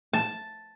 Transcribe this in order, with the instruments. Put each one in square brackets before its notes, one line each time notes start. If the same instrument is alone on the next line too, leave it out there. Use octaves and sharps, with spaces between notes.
[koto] A5